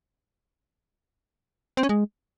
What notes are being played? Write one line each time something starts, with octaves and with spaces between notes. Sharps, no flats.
C4
C#4
G#3